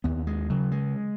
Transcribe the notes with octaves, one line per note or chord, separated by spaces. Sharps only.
D#2 B3
G#3
C#3 F#3
G#3